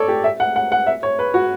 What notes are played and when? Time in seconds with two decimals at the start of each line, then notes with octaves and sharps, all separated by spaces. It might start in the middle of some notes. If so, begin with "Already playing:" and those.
Already playing: A4 C#5 D5
0.08 G4
0.24 E5
0.40 F#5
0.56 F#5
0.72 F#5
0.87 E5
1.03 C#5
1.19 B4
1.34 F#4